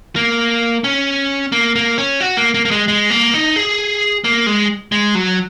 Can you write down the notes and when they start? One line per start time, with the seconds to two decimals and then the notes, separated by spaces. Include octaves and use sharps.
0.16 A#3
0.84 C#4
1.52 A#3
1.76 A#3
1.98 C#4
2.20 F#4
2.37 A#3
2.54 A#3
2.65 A#3
2.71 G#3
2.88 G#3
3.10 A#3
3.34 D#4
3.56 G#4
4.24 A#3
4.46 G#3
4.92 G#3
5.15 F#3